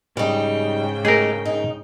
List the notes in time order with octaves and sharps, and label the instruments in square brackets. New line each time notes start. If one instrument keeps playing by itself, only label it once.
[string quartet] G#2 C#3 G5 [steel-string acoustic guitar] G3 D#4
[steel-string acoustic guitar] A3 D#4 G4 [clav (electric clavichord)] G#4 A#4
[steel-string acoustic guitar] D#4